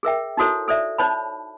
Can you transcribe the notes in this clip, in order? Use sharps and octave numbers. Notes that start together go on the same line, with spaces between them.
G#4 A#4 E5 G5
D#4 E4 F#4 A4 C5 C#5
A4 C5 D5 E5
D#4 C5 C#5 A5 B5